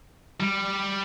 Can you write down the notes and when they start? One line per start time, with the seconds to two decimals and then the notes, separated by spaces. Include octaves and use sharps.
0.40 G3